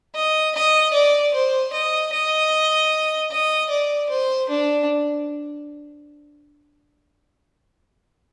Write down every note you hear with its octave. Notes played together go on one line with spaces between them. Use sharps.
D#5
D#5
D5
C5
D#5
D#5
D#5
D5
C5
D4